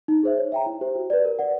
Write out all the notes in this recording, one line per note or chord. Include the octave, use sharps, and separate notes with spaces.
D#4
G#4 C5 E5
C#5
E5 G5 A#5
E4
G4 C5
F#4
B4 D5
A#4
D5 F#5